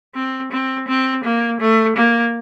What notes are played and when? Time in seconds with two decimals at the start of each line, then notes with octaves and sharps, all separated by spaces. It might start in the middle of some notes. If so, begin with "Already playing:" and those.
0.15 C4
0.52 C4
0.88 C4
1.24 A#3
1.61 A3
1.97 A#3